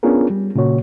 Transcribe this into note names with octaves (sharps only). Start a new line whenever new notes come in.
B3 C#4 D4 F4 G#4 A#4
G3
A#2 C#3 A#3 F#4 C#5